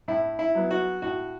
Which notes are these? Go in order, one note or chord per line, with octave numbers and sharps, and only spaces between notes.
A2 E4
E4
F#3 B3
F#4
A2 F#4